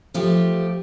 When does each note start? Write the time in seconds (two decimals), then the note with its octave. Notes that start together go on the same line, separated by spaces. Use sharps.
0.14 F3 A3 G4